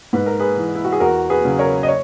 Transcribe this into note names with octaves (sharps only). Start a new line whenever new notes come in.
G#2 B4
A#4
G#4 B4
E3
E4
F#4
G#4
E2 F#4 A#4
G#4 B4
C#3 F#3
A#4 C#5
D#5
C#5